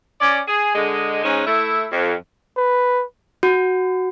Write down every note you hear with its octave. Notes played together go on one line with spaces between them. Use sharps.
C#4 D5
G#4
D3 G#3
G#2 G#3 C#4
A3 E4
F2
B4
F#4